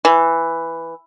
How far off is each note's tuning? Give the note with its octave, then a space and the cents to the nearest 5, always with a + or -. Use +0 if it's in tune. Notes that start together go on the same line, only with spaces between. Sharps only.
E3 +5